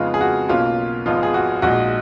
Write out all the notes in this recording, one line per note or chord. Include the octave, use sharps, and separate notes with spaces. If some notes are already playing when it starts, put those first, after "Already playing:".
Already playing: F2 C#3 G#3 B3 D#4 F4
G#4
F#4
B1 B2 A#3 C#4 F4
G#1 G#2 F3 B3 D#4 F4
G#4
F#4
A#1 A#2 G#3 D#4 F#4